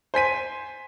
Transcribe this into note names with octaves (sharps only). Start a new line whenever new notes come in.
C5 G#5 B6 D#7